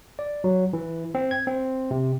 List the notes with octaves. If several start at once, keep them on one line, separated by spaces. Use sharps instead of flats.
D5
F#3
E3
C4
G#6
C4
C3